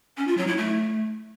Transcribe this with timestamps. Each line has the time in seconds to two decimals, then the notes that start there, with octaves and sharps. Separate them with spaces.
0.17 C#4
0.27 F4
0.37 F#3
0.47 E4
0.58 A3